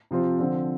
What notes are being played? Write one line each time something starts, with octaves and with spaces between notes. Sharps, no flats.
C3 F3 C4 F4
D3 F3 C4